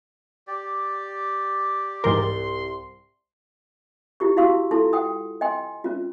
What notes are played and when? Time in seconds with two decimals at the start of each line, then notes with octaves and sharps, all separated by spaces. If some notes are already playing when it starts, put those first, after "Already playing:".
0.47 G4 D5
2.04 C2 G#2 E3 A#4 C6
4.20 E4 F4 G4 C#6
4.37 E4 F#4 F5 C6 C#6 E6
4.71 E4 F4 A4 A5 C6
4.93 F#5 G5 D#6
5.41 D#5 G5 G#5 C6
5.84 C#4 F4